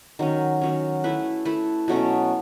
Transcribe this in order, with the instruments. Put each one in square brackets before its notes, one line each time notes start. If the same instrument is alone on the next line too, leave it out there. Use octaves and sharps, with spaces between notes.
[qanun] D#3 F#3 C#4
D#3 F#3 C#4
A3 E4 B4
A3 E4 B4
B2 F#3 A3 C#4